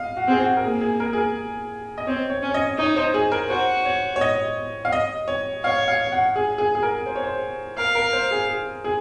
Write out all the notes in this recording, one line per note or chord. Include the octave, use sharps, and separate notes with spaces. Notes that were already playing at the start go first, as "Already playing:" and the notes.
Already playing: D#5 F5
F#4
C4 G#4
F#4
A#4
A#3 G#4
G#4
A#4
G#4
A#4
D#5
C4 C#5
C#5
C#4
C#5
D#5
D#4 C#5
C5
G#4
A#4
F#4 C5
C#5
C#5
D#5
F5
D#5
C#5
C#5 F5
F5
F#5
G#4
G#4
G#4
A#4
C5
C#5
C5
A#4 F5
A#4
C5
G#4
G#4
G#4